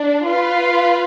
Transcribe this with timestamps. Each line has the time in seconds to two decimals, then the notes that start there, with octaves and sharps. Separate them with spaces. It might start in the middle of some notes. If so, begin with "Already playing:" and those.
Already playing: D4
0.24 F4 B4 F5